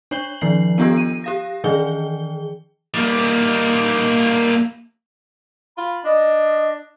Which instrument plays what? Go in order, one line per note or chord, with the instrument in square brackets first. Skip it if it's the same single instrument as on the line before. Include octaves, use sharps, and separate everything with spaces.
[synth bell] D4 C#5 F#7 G7
D#3 F3 C7 F#7
B3 D4 F4 G4 A4
D#7
G4 F5 A#6
D#3 E3 G#4 G5 G7
[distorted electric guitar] G3 A#3
[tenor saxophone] F4 [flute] B5
[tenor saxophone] D4 [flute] D#5